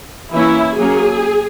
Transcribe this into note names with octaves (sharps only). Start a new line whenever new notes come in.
E3 A#3 C#4 E4
F#3 A#3 C#4 G#4